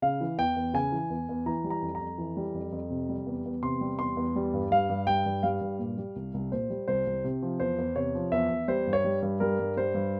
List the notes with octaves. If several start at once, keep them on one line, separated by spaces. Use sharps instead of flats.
C#3 F5
E3
E2 G5
E2
C#3 G#5
E3
E2
E2
E3 A#5
G3
A#5
F2
A#5
F2
E3
G3
F2
F2
C3
G3
E2
E2
C3 C6
G3
E2 C6
E2
G3
G2
G3 F5
G2
G3 G5
G2
G3 F5
G2
A#2
G3
C2
C2
A#2 C5
G3
C2 C5
C2
C3
F3
E2 C5
E2
C3 C#5
F3
E2 E5
E2
G3 C5
G2
C#5
G3
G2
G3 A#4
G2
G3 C5
G2